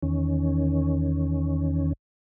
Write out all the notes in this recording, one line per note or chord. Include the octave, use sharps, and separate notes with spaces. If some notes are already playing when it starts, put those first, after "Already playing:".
E2 D#3 C#4